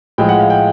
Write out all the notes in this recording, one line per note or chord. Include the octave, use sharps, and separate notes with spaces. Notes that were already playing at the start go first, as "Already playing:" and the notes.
A2 F3 G#3 G5
F#5
F5
G5